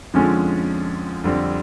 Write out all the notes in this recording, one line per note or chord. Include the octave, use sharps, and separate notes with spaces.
F2 D3 F3 G#3 C#4
F2 D3 G3 C4